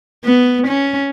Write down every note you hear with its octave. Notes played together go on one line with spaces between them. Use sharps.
B3
C#4